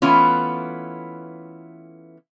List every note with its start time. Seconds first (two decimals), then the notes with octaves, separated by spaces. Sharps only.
0.02 E3 A3 B3 C#4 E4 F4